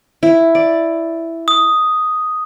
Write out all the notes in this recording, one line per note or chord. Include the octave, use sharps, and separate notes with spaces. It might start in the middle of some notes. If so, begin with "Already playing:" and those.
E4
D5
D#6